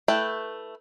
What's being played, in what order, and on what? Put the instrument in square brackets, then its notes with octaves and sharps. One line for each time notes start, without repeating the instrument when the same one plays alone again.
[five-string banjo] A3 E4 B4 G5